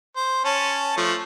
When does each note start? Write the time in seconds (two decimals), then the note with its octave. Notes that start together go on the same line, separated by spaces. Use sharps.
0.16 C5
0.45 C#4 A5
0.97 F3 A3